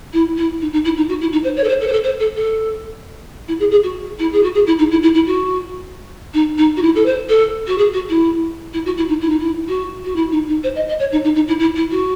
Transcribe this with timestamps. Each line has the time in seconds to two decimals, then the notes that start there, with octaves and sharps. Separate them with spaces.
0.13 E4
0.37 E4
0.61 D#4
0.72 D#4
0.84 E4
0.96 D#4
1.08 F#4
1.21 E4
1.32 D#4
1.44 C5
1.56 C#5
1.63 A4
1.68 C5
1.80 A4
1.87 C5
1.92 A4
2.03 C5
2.20 A4
2.36 A4
3.48 E4
3.59 G#4
3.71 G#4
3.83 F#4
4.19 E4
4.32 G#4
4.43 F#4
4.54 G#4
4.66 E4
4.78 D#4
4.91 E4
5.02 E4
5.14 E4
5.26 F#4
6.34 D#4
6.58 D#4
6.76 F#4
6.82 E4
6.95 A4
7.05 C5
7.29 A4
7.67 F#4
7.78 G#4
7.93 F#4
8.09 E4
8.73 E4
8.85 F#4
8.97 E4
9.08 D#4
9.20 E4
9.29 D#4
9.39 E4
9.68 F#4
10.04 F#4
10.15 E4
10.31 D#4
10.48 D#4
10.63 C5
10.75 D#5
10.88 D#5
10.99 C#5
11.12 D#4
11.24 D#4
11.35 D#4
11.47 E4
11.59 E4
11.75 E4
11.91 F#4